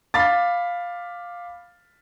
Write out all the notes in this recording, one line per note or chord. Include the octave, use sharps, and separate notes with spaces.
F5 B5 D6 A6